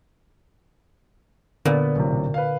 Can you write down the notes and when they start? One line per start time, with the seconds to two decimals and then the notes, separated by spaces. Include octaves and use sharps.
1.65 A#2 D3 B3 B4
1.96 B1 A2 C3
2.34 B4 F5